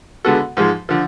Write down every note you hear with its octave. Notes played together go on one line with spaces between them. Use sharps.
D3 G#3 B3 F#4 A4
G#2 F3 G#3
D3 F3